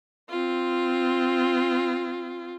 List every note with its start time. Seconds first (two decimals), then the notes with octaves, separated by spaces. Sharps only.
0.29 C4 F4